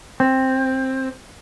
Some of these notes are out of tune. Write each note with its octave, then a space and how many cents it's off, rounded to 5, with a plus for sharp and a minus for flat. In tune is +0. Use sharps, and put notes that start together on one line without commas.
C4 +10